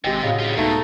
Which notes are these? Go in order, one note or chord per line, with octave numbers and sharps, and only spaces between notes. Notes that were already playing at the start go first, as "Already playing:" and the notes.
G#1 C3 G#3 C4 G4 G5
A2 C#3 F#4 G4 F5
G3 F4
C#2 B2 A3 D#4